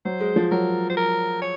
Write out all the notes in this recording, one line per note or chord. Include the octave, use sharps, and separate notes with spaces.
F#3 C5
G#3
F3
F#3 A#4
C5
A#4
C#5